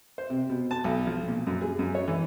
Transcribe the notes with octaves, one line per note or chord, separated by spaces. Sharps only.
C5
C3
B2
A5
B1
F3
A#2
F#2
G#4
F#2
C#5
E3